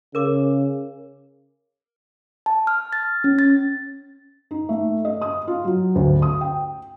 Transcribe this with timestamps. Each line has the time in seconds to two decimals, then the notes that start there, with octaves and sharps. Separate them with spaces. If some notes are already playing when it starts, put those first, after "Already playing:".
0.15 C#3 A#4 D6
2.46 A5
2.67 F6
2.93 A6
3.24 C#4
3.39 A6
4.51 D#4
4.69 A3
5.05 D#5
5.22 D#6
5.48 F4
5.65 F#3
5.95 D2
6.22 D#6
6.41 G5